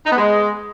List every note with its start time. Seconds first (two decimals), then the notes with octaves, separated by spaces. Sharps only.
0.05 D#4
0.11 B3
0.17 G#3